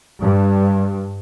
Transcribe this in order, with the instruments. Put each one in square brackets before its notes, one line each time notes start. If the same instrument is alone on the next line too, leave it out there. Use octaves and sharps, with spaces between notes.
[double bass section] G2